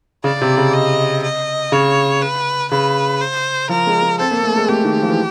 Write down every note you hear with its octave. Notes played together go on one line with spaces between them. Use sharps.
C#3 D5
C3
C#3
D#5
D#5
C#3 C#5
B4
C#3 B4
C5
F3 A#4
G#3
G#3
C4 A4
A#3
A3
G#3
A3 G4
D#3
F3
E3